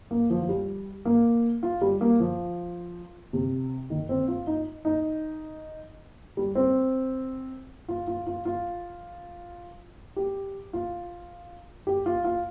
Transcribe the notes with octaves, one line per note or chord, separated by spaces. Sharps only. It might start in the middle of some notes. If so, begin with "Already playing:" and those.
A#3
F3
F3
G3
A#3
F4
G3
A#3
F3
C3
D#3
C4
F4
D#4
D#4
G3
C4
F4
F4
F4
F4
G4
F4
G4
F4
F4